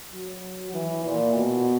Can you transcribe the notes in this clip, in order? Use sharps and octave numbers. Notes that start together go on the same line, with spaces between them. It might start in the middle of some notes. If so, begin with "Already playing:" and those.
F#3
E3
A#2
B2